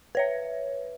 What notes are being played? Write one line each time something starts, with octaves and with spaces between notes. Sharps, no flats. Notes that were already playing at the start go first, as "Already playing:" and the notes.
B4 C#5 E5